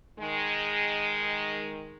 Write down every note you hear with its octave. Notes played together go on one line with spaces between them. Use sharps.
D#3 G#3